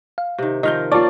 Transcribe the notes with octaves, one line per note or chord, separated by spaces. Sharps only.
F5
C3 D#3
D#3 F3 A#4 D#5 F6 G6
A#3 C#4 F4 D5 A5 D6